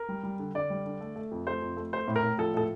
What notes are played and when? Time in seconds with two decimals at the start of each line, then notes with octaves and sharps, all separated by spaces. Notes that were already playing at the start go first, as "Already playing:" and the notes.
Already playing: A#4
0.09 G3
0.23 G3
0.39 D3
0.54 D3 D5
0.70 G3
0.86 D3
1.01 A3
1.16 A3
1.31 F2
1.47 A3 C5
1.62 F2
1.77 A3
1.93 A3 C5
2.08 A2
2.16 A#4
2.24 A2
2.38 F3 A4
2.54 A2 A4